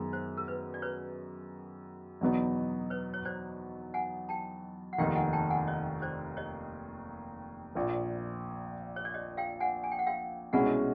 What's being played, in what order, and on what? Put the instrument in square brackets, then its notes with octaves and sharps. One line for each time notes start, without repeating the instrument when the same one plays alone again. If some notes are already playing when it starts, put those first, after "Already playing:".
Already playing: [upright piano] F#2 D#3 G#3 B3
[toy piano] C5
A#4
B4
D5
B4 C#5
[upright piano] E2 B2 F#3 B3 D#4
[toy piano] B4 C#5
C#5
C5 D5
F#5 G#5
G5 A5
F#5
[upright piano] F1 D#2 D#3 [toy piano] F5 G5
[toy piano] F#5 G#5
G5 A5
F#5 G#5
C#5 D#5
C5 D5
C#5 D#5
[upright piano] A#1 A#2 F3
[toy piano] C#5
D5
C#5 D#5
F5 G5
F#5 G#5
G#5
G5
F#5
F5 G5
[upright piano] C2 B2 G#3 C#4 E4 [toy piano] F#5 G#5